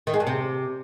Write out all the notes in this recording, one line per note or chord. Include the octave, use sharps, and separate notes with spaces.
D#3
G#3
G2
C3